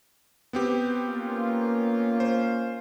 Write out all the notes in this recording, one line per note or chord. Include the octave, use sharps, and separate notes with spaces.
B3 C4 G4
A#3 C#4 F4
C5